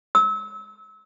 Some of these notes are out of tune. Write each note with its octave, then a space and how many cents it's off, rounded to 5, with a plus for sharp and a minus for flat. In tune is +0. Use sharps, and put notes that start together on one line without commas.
E6 -30